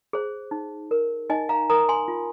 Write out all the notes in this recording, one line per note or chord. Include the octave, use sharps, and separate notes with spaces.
G#4 C5
D#4
A#4
D#4 D#5 G#5
F5 A#5
A#4 A#5 D#6
G#5 C6
F4